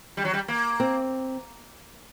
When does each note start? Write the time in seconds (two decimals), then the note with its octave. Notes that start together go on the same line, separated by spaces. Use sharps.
0.17 G3
0.25 F#3
0.33 G3
0.48 A#3
0.80 C4